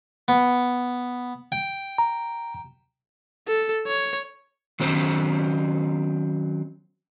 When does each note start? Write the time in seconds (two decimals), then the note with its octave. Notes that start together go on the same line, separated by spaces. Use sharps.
0.28 B3
1.52 G5
1.98 A#5
3.48 A4
3.87 C#5
4.80 D#3 F#3 C4 C#4 C5